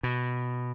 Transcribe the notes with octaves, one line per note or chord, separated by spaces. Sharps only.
B2